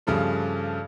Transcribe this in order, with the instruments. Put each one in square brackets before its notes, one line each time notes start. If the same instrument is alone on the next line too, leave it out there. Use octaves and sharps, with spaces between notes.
[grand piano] G2 C#3 F3 A3